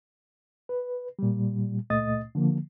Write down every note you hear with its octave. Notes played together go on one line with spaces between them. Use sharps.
B4
A#2 G3
C#2 A#2 A3 D#5 D#6 A6
D3 F3 A#3